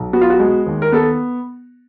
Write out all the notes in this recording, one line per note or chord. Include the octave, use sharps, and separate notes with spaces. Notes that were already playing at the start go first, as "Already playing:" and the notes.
Already playing: B1
B3 F#4
F4
F#4
G#3
D#2
A#4
B3 A4